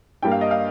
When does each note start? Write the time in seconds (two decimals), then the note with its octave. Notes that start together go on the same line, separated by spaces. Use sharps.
0.22 G2 G3 A#3 G5
0.31 F5
0.41 D#5
0.51 F5